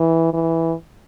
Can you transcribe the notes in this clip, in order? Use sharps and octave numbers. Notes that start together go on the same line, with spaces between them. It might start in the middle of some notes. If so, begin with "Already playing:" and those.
Already playing: E3
E3